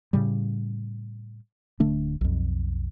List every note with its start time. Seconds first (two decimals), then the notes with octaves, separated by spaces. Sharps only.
0.13 A2 C#3 G3
1.80 D1 D3 A3 D4
2.21 B1 F2